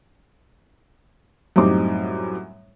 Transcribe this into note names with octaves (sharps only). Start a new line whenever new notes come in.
F#2 A2 G3 C4 D#4 D6